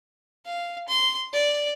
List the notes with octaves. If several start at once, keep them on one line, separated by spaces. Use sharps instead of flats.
F5
C6
D5